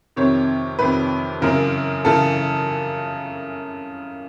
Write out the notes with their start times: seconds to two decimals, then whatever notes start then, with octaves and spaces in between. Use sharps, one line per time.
0.16 F2 C3 D#3 C#5
0.79 F2 C3 D#3 B4
1.41 F#2 C#3 E3 A#4
2.05 F#2 C#3 E3 A4